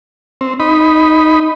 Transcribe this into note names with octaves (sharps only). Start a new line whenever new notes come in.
C4
D#4 B5